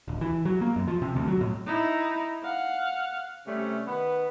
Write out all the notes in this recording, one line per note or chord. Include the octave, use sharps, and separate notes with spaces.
D1
E3
F#3
A#3
F#2
F3
C3
D2
F#3
A2
D#4 E4
F5 F#5
C3 G3 A3 C#4
D#3 B3 B4